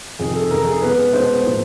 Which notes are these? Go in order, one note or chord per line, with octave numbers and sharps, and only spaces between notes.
F2 C3 D#3 G#4
A4
F2 C3 D#3 A#4
G#4
B2 G#3 B3 B4
B2 G#3 B3 C5
A2 F3 A#3